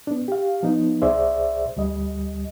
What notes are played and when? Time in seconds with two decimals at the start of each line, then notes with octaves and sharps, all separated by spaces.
0.07 B3 D4
0.28 G4 F5
0.63 F3 B3 D#4
1.02 C2 G#4 C5 D5 E5
1.76 D2 G3 D#5